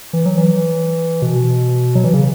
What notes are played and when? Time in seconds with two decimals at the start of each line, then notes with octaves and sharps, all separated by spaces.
0.13 E3
0.26 F#3
0.38 E3
1.22 B2
1.95 F#3
2.04 E3
2.14 C#3